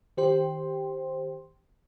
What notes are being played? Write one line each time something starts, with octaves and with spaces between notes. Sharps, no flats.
D#3 G4 C5 G5 C6